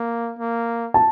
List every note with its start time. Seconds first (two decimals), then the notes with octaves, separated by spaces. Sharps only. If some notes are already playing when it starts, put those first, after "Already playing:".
Already playing: A#3
0.39 A#3
0.94 A5